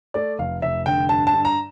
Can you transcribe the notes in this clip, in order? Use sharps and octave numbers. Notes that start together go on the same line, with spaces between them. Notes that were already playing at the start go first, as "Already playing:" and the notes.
A3 D5
F1 F5
F1 E5
D3 G5
G2 A5
A5
G2
A#5